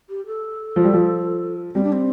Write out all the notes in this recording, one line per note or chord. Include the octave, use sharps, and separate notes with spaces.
G4
A4
F3
G3
F3
G3 C4
D4
C4